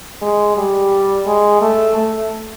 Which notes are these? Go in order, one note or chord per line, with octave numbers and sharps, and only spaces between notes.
G#3
G3
G#3
A3
A3